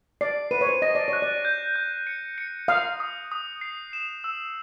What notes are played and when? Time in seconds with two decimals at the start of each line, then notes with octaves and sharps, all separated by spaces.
0.21 D5 C7
0.51 B4 D#7
0.61 C#5
0.67 C5
0.82 D#5 A#6
0.95 D5
1.08 C#5 F#6
1.22 D5
1.45 G6
1.76 G6
2.07 C#7
2.38 C#7
2.68 F5 D#6
3.00 D#6
3.32 D#6
3.61 C7
3.93 E7
4.24 E6